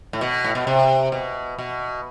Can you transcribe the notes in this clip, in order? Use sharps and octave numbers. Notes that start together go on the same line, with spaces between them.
A2
B2
A2
B2
C3
B2
B2